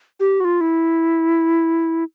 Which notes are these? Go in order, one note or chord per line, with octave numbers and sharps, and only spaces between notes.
G4
F#4
F4
E4